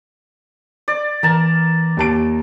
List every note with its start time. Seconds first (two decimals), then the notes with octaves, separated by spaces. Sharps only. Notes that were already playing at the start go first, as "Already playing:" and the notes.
0.88 D5
1.23 E3 B3 A#4 G#5 A5
1.97 D#2 A5 D7